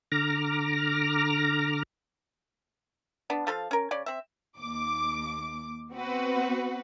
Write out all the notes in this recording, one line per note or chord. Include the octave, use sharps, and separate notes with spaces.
D3 A#5 D6 F6 A#6
B3 D4
F3 A4 A#4 F5
C#4 A#4
C#3 C#5 D5
C4 E5
D#2 D6
B3 C4 F#4 B4